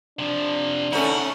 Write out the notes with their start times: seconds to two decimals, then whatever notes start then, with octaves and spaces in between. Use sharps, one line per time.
0.19 C3 F3 D4
0.93 A3 C#4 D#4 E4 F#5